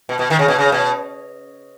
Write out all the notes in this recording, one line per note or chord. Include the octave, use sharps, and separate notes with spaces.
B2
B2
D#3
C#3
B2
C#3
B2